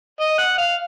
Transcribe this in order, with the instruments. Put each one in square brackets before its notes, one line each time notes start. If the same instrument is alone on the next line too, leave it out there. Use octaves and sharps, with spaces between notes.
[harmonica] D#5
F#5
F5